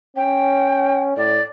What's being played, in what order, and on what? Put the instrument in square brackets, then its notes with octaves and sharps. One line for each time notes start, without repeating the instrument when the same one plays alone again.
[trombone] C#4 [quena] G5
[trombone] A2 [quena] D5